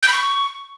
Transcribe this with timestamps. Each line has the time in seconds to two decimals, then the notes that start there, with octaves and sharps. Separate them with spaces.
0.03 G6
0.08 B5
0.13 C#6